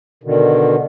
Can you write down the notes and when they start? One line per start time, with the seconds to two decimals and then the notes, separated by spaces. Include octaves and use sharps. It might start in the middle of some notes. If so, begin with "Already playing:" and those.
0.23 B2 D3 D#3